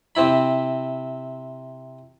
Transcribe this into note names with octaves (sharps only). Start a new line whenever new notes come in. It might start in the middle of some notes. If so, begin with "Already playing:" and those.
C3 C4 E4 B5